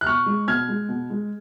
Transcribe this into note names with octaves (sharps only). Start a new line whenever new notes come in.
F#6
B2 C#6 F6
G#3
B2 F6 G#6
G#3
B2
G#3